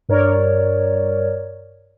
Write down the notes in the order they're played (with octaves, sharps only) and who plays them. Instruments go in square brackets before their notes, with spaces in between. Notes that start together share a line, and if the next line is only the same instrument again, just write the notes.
[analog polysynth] G2 A#4 C#5 D5